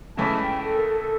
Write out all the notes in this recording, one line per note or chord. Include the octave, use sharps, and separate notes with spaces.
C#2 C#3 E3 A3 C#4 A5
G5
A4
A#4
A4